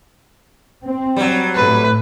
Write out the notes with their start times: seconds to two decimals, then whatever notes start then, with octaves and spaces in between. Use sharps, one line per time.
0.84 C4
1.16 F#3 G3
1.55 A2 A3 B4